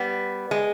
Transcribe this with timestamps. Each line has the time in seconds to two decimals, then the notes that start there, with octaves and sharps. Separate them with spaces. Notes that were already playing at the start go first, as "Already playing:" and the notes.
Already playing: G3 B3
0.51 G#3